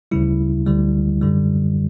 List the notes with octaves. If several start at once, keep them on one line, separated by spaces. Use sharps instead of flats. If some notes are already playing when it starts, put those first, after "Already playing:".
D2 C#3 G3 E4
D2 D3 G3
F#2 D3 G3